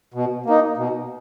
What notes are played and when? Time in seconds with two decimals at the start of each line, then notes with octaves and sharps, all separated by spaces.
0.14 B2
0.46 A#3 D#4
0.77 B2